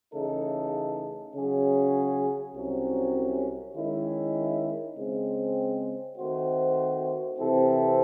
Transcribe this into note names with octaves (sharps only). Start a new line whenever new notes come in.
C#3 E3 A3 D#4 A4
C#3 F#3 C#4 G#4
C2 C3 F#3 C#4
D#3 G#3 C#4 E4
C#3 G#3 C4
D#3 A3 C4 F#4 C5
C3 E3 C4 E4 A4